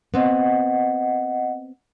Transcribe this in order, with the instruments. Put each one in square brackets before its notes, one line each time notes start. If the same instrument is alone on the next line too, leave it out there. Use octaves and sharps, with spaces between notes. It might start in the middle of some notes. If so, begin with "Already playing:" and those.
[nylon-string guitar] B3 C4 [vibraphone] D#5 F#5